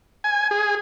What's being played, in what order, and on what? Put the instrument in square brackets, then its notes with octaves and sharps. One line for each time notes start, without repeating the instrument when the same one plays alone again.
[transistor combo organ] G#5
G#4